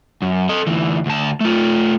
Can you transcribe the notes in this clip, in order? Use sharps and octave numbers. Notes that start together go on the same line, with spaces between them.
F#2
A4 D#5
D2 E3
D2 A5
A3 F4